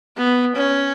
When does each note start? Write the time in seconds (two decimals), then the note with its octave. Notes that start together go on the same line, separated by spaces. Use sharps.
0.18 B3
0.56 C#4